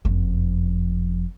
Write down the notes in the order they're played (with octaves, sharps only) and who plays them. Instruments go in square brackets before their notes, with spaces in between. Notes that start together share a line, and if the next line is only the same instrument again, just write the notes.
[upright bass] F#1 F2